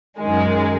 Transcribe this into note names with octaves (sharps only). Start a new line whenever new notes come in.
F#2 D#3 G#3